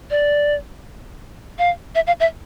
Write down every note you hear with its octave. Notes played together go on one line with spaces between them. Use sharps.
D5
F5
E5
F5
E5